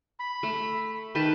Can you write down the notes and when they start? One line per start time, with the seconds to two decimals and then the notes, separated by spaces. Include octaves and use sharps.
0.19 B5
0.43 A3
1.15 D#3 B4 G5 A5 B5